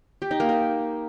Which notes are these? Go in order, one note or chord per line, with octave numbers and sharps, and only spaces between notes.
G4
D#4
A#3
A#4